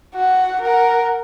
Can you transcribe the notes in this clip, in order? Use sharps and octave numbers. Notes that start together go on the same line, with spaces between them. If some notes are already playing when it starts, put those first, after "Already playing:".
F#4 F#5
A#4 F#5